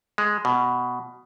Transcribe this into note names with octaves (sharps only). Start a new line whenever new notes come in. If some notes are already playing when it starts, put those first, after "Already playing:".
G#3
B2